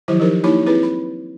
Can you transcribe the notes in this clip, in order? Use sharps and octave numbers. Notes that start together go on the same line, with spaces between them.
D#3 F3 F#3 E4 G4 C5
F3 F#3 D#4 G4 A#4 C5
A#3 D#4 E4 G4 C#5 B5
C4 E4 G#4 B4
B5